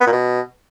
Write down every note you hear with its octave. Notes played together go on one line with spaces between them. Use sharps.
B3
A#2
B2